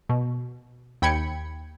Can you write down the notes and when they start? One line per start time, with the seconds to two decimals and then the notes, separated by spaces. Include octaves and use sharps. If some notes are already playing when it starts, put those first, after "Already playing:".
0.09 B2
1.02 D#2 G5 B5 G#6 C#7